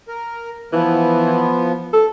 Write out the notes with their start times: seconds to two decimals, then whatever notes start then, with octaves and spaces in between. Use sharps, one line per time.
0.08 A#4
0.73 E3 F3 B3
1.93 A4